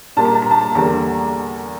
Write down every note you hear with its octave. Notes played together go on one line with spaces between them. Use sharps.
A#2 G3 A#3 A5
A#5
A5
A#5
A5
E2 D3 G3 A#3 A#5